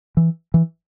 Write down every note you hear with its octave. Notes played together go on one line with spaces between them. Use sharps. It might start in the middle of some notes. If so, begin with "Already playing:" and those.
E3
E3